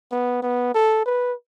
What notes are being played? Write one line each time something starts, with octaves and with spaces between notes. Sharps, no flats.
B3
B3
A4
B4